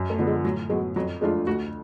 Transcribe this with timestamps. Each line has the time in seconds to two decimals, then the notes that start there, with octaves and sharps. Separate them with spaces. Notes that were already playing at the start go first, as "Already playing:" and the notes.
Already playing: F#2
0.10 A3
0.19 D3 F3 B3
0.27 G#3
0.45 A2 F#3
0.70 F#3 G#3 B3
0.96 F2 F#3
1.21 F3 G#3 A3 D4 F4
1.47 D2 F#4